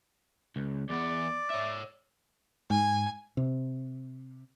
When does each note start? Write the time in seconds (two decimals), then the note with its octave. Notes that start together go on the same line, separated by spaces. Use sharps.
0.56 C#2
0.90 E2 B3 D5
1.50 C#5 E5
2.70 G#2 G#5
3.37 C3